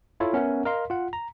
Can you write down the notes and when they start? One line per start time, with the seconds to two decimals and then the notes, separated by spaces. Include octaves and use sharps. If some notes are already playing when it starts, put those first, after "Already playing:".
0.20 E4 F4 A4 C#5
0.33 B3 C#4 A#4 E5 F#5
0.65 A#4 D#5 F5 C6
0.90 F4 F#5
1.13 A#5